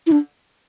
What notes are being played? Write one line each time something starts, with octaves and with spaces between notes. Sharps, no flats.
E4
D4